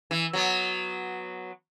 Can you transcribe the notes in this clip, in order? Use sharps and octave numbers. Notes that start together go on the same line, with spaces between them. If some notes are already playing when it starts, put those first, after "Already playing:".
E3
F#3 B3